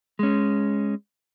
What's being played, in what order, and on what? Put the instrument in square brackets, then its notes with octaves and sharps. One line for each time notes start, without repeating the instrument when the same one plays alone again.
[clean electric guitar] G#3 C#4